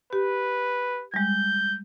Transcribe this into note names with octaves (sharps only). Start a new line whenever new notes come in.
G4 B4
G3 G#3 G6